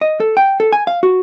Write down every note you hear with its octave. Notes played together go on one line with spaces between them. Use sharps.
D#5
A4
G5
A4
G#5
F5
F#4